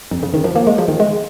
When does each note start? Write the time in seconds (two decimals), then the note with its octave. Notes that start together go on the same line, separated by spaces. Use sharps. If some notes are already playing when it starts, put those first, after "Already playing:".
0.11 F2
0.23 C#3
0.34 D#3
0.44 F3
0.56 A#3
0.67 G#3
0.78 F3
0.88 D#3
1.00 G#3